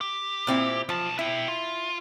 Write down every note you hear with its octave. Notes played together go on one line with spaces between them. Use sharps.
G4
A#2 C4 E4
B1 F3 A5
E4 E5 G5
F4